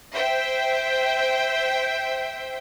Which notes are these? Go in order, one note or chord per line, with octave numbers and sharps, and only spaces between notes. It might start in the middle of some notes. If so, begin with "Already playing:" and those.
C5 E5 G5